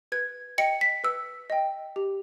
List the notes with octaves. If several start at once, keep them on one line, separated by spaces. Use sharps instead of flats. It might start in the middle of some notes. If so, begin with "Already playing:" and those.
B4 G#6
D#5 G5 C#7
B6
B4 E6
D#5 G5
G4